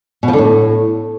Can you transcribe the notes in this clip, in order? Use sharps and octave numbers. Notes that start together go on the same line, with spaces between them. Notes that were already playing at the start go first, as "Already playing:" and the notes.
B2
F3
D3
A2